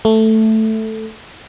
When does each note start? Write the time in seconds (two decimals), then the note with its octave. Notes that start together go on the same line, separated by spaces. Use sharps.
0.05 A3